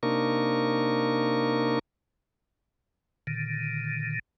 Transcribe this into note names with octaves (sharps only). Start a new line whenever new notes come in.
C3 A#3 D4 D#4 A#4 C#6
A#2 D3 D#3